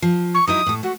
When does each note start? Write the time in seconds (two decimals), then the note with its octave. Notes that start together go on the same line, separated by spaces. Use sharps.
0.02 F3
0.34 C#6
0.47 F#3 D#4 E4 D#6
0.66 A2 A4
0.83 A3 F#4